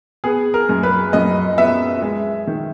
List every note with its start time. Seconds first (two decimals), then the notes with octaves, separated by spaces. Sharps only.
0.24 B3 G#4
0.54 A#4
0.69 F#2
0.83 B4
1.13 F#2 D#5
1.58 B3 E5
2.02 G#3
2.47 D#3